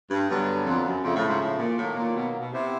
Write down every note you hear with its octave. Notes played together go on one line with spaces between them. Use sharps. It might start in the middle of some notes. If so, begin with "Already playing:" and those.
G2
G2 D3 F#3 B3
F2
F#2
F2 C#3 F3 A3
A2
G#2
A2
A#2
A2 D#3 F#3 A#3
A#2
B2
B2
C3 B3 E4 G4 C5